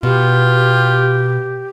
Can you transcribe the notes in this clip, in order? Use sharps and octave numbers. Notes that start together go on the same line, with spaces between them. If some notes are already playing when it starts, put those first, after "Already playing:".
B2 F4 G4